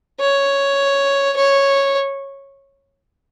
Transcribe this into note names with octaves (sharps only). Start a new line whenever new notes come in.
C#5
C#5